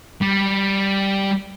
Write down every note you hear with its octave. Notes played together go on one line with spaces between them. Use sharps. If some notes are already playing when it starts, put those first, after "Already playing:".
G3